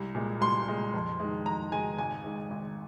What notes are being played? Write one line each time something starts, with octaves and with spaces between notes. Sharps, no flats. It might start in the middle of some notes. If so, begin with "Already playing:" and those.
Already playing: C2
A#2 G#3
C2 C6
A#2 G#3
F2
D#3 G#3
F2 A#5
D#3 G#3 G#5
G#1 G#5
G#2 D#3 G#3
G#1